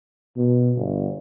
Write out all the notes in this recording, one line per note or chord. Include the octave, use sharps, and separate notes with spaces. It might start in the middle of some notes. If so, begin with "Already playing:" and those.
B2
G1